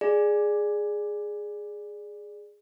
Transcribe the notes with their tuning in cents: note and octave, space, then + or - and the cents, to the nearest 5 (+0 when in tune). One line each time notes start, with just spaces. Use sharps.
G#4 +0 D5 +10